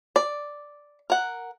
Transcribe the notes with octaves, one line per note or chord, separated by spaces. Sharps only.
D5
A#4 F#5